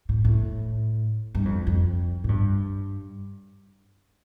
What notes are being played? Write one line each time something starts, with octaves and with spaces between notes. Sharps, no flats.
A2
A2
G2
F2
F2
A2
G2